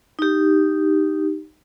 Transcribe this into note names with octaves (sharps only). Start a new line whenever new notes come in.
D#4 G4